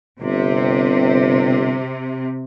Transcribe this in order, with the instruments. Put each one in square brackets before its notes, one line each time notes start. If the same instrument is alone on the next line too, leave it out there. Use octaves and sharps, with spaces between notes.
[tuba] G1 [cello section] C3